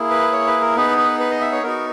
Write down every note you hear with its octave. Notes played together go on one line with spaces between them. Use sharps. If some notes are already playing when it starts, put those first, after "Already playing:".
Already playing: A#3 E4 G#4
B4
C#5
B4
A#4
B3 D#4 G#4 B4
B4
B4
D#5
E5
C#5
B3 D#4 F#4 A#4